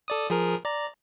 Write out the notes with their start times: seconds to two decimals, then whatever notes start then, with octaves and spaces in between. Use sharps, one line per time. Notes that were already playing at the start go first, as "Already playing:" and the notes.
0.08 A4 D5 D#6
0.30 F3 G#4 A#4
0.65 D5 A#5